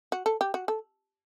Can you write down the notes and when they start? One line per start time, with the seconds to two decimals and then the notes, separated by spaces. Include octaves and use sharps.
0.12 F#4
0.26 A4
0.41 G4
0.54 F#4
0.68 A4